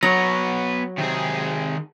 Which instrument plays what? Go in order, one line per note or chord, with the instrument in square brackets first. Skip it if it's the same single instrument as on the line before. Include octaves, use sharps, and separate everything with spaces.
[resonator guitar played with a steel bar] F#3 [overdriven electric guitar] B3 C#5 [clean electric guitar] A#5
[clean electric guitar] C3 C4 [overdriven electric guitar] D#3 G#4